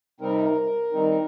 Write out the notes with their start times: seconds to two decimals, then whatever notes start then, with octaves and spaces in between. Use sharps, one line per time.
0.20 C3 G3 C4 D#4 A#4
0.92 D#3 G3 C4 D#4